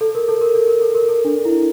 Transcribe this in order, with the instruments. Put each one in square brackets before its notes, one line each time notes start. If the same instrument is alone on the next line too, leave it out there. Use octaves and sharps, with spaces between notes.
[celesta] A4
A#4
A4
A#4
A4
A#4
A4
A#4
A4
D4
E4